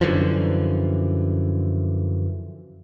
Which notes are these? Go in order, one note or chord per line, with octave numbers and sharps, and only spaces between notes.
F#2 D3 E3 F3